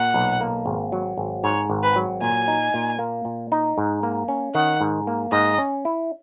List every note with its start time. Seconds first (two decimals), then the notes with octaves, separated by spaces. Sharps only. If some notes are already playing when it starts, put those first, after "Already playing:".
Already playing: A#2 F#5
0.14 B1
0.41 A#3
0.66 G#1
0.92 F#3
1.17 G#1
1.44 G#2 C#5
1.70 G#1
1.83 B4
1.96 F#3
2.21 A#2 G#5
2.48 D#4
2.74 A#2
2.99 A#3
3.25 A#2
3.52 D#4
3.78 G#2
4.03 A#3
4.28 C#4
4.54 D#3 F#5
4.81 G#2
5.07 A#3
5.32 G#2 D#5
5.58 C#4
5.85 E4